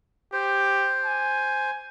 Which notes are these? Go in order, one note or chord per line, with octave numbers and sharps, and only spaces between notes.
G4 C5
G#5